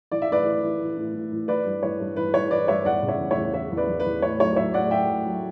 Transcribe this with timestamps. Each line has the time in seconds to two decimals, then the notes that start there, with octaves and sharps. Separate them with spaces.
0.12 E3 D5
0.22 E5
0.29 E3 B4 D5
0.45 E3
0.63 E3
0.80 E3
0.97 A2
1.14 A2
1.32 E3
1.48 E3 B4 D5
1.66 G2
1.83 E3 C#5
2.00 G2
2.16 E3 B4
2.34 E3 C#5
2.51 E3 B4 D5
2.68 G2 C#5 E5
2.85 E2 D5 F#5
3.02 C#3
3.08 C#5 E5
3.19 E2
3.31 C#5 E5
3.36 E2
3.54 E3 C#5 E5
3.71 E2
3.77 B4 D5
3.89 E2
4.00 B4
4.05 E2
4.22 A2 C#5
4.40 F#3 C#5
4.56 F#3 C#5 E5
4.74 A2 D5 F#5
4.91 F#3 E5 G5
5.08 F#3
5.26 F#3